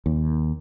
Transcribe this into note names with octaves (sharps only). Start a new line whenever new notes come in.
D#2